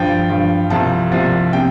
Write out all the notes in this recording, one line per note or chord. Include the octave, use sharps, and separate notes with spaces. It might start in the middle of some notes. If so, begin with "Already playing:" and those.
Already playing: G2 F3 G5
G2 F3
C2 C3 F3 A5
C2 C3 F3
C3 G5